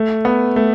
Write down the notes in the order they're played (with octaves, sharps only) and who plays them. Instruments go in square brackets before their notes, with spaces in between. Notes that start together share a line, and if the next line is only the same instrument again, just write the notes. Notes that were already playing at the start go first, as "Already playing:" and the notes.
Already playing: [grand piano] A3
B3
A3